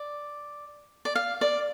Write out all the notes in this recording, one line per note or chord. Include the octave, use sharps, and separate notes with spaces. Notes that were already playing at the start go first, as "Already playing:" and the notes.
Already playing: D5
D5
F5
D5